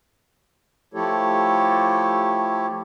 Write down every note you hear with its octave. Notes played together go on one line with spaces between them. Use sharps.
F3 A3 E4 G4 A4 C#5